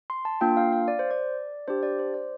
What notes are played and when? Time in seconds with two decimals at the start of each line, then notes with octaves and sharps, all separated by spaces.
0.10 C6
0.25 A5
0.41 A#3 D4 F4 G5
0.57 F5
0.72 F5
0.88 D5
0.99 C5
1.11 D5
1.68 D4 G4 C5
1.83 D5
1.99 C5
2.14 D5